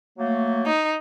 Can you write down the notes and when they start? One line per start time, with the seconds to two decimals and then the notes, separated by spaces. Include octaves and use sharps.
0.18 F#3 A3 A#3
0.66 D#4